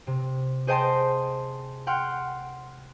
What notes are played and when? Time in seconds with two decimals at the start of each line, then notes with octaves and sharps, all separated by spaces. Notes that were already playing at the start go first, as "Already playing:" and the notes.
0.07 C3
0.67 G#4 C5 D#5 G5 A5 C6
1.87 F#5 G5 C6 F6